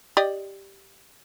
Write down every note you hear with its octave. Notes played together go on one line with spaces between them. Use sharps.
G4 D5 D#5